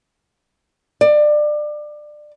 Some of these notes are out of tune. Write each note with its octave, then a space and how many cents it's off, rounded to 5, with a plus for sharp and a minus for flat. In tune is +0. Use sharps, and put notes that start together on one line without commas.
D5 +25